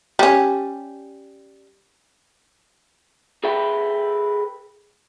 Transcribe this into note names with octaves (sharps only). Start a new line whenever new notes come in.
G3 C#4
G#4 A4 B4 E5 G5